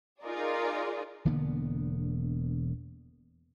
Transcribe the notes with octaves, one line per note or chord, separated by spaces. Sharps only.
D#4 F4 G#4 A#4 D5
E1 D3 A#3 B3